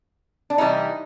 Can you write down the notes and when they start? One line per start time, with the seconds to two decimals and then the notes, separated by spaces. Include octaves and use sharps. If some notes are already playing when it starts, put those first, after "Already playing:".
0.50 D4
0.58 C3 E3 G3 D#4